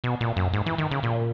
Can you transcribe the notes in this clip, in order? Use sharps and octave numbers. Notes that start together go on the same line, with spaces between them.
B2
A#2
F#2
G#2
E3
D#3
C#3
A#2